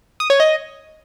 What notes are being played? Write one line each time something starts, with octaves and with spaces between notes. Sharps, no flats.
D#6
C#5
D#5